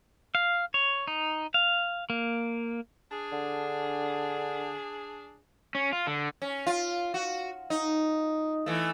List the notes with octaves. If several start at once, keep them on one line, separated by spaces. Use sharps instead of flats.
F5
C#5
D#4
F5
A#3
D4 G#4
D3
C#4
F4
D3
C#4
F4
F#4
D#4
E3 A3